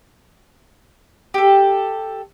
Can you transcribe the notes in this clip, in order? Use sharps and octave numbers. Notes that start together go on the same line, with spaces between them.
G4 A4